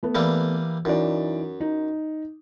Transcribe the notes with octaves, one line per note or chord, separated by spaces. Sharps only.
A3 B3
E3 G3 A#3
F#2 E3 D#4 D5
D#4